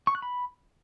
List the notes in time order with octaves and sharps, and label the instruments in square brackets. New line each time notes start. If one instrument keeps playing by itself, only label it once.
[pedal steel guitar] C#6
F#6
B5